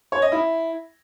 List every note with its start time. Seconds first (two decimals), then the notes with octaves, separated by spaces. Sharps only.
0.12 C#5
0.22 D#5
0.32 E4